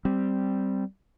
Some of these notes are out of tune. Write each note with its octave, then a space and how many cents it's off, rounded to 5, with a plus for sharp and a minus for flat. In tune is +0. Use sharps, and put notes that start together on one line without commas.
G3 -5 C4 +0